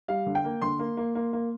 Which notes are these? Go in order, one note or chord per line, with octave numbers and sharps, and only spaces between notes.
G3 F5
D3
G5
A#3
D3 C6
A#3
A#3
A#3
A#3